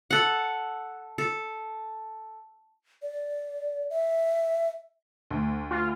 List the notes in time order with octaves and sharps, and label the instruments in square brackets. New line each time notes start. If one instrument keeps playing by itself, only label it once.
[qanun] A4 F#5
A4
[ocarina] D5
E5
[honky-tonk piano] D2
[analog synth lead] F4